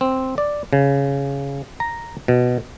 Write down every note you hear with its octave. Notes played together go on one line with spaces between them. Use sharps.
C4
D5
C#3
A#5
B2